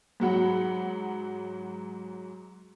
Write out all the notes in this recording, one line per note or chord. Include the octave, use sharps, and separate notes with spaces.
G#2 F#3 F#5 B5